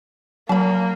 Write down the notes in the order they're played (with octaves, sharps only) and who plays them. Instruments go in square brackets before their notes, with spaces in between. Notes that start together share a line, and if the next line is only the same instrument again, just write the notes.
[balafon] F#3 [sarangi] A#3 [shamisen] A5 B5